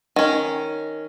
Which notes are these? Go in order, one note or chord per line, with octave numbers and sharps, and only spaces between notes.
D#3 C#4